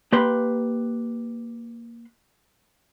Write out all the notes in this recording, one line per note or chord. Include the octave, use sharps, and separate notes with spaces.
A#3 G4 B4 C6